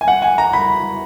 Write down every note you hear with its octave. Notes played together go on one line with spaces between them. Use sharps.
G#5
F#5
G#5
A#5
B5